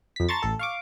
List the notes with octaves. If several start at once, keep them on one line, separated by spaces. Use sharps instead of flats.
F2 B6
A5 A#5 C6 C#6 A6
A1 A4
F5 C#6 D6